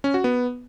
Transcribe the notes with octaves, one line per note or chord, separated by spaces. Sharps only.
C#4
F#4
B3